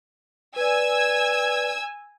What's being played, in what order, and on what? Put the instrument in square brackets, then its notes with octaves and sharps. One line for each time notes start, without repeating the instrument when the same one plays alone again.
[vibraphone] B4 D5 [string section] G#5 E6 G#6